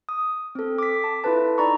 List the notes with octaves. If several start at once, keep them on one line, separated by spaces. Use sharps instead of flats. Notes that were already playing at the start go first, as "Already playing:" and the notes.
D#6
C4 A4
D6 B6
A5
E4 F4 A4 B4 A5
D#4 D5 A#5 B5 C#6